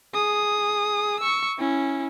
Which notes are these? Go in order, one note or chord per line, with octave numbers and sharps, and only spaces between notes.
G#4 D#6
C#6 E6
C#4 E4